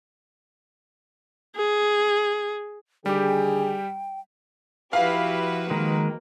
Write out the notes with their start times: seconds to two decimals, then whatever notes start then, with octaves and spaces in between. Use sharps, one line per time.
1.56 G#4
3.06 D3 D#3 G3 G4 G#4 G5
4.93 F3 E4 F#4 G4 B4 F5 B5
5.70 D#3 G#3 A#3